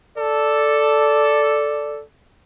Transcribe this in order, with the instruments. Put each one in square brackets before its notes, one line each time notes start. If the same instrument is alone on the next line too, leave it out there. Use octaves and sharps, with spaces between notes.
[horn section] A4 [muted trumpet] D5